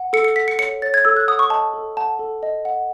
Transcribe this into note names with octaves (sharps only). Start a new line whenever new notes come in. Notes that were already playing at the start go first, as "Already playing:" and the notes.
Already playing: F#5
A4 C#7
C#7
F#5 B6
C#7
C#5 C#7
C#5 A6
G#6
A4 E6
F#6
F#5 D#6
C#6
D#5 A5
A4
F#5 A5
A4
D#5
F#5